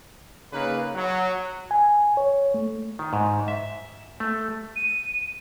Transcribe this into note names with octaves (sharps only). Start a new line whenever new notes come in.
C#3 A#3 D#4 B4
F#3
G#5
C#5
A3
D#3
G#2
E5
A3
D#7